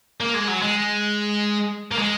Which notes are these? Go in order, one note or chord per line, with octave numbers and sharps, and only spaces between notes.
A#3
G#3
F#3
G#3
A#3
G#3